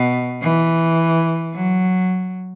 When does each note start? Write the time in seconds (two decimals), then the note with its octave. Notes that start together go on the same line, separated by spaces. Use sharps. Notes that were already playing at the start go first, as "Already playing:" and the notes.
Already playing: B2
0.42 E3
1.54 F#3